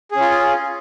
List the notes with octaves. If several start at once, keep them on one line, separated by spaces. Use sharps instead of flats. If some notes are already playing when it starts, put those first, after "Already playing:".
C#4 F4 G#4